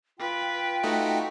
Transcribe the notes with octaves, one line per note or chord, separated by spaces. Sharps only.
F4 B4 G5
A3 D#4 F#4